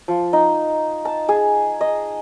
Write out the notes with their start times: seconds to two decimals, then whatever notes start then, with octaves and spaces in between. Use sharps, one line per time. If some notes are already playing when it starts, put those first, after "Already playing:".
0.08 F3
0.33 D#4
1.05 A5
1.29 G#4
1.81 D#5